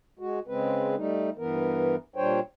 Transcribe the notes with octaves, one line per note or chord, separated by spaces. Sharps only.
G#3 F#4
C#3 G#3 C4 B4
G3 A3 D#4
G2 E3 B3 A#4
A#2 G3 D4 C5 C#5 G5